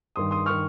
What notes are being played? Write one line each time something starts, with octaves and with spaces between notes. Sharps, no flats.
G2 D#3 C6 D#6
C6 D#6
D#3 C#6 F6